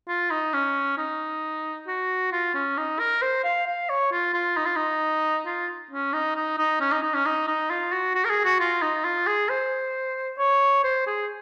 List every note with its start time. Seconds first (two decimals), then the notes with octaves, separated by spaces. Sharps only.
0.08 F4
0.31 D#4
0.53 C#4
0.97 D#4
1.87 F#4
2.32 F4
2.54 C#4
2.77 D#4
2.99 A#4
3.22 C5
3.44 F5
3.67 F5
3.89 C#5
4.12 F4
4.33 F4
4.57 D#4
4.66 F4
4.76 D#4
5.46 F4
5.91 C#4
6.13 D#4
6.35 D#4
6.58 D#4
6.80 C#4
6.92 D#4
7.03 D#4
7.14 C#4
7.25 D#4
7.48 D#4
7.70 F4
7.92 F#4
8.15 F#4
8.25 A#4
8.30 G#4
8.45 F#4
8.60 F4
8.82 D#4
9.04 F4
9.27 G#4
9.49 C5
10.38 C#5
10.84 C5
11.06 G#4